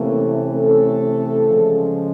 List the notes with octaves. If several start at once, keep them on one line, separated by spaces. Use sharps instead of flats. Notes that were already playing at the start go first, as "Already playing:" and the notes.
Already playing: C3 E3 A3 A#3 C#4
A3 A4
C#3 F3 G#3